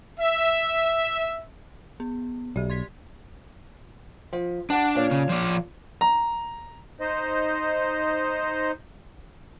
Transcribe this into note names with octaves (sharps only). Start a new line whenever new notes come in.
E5
B3
B1 G4 D5
C6 G#6 B6
F3
D4 G4 F#5 A5
A#2 C#5 F5
C#3
F3 D5
A#5
D#4 C5 D#5